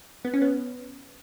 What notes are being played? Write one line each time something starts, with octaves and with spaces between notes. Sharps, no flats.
B3
C#4
B3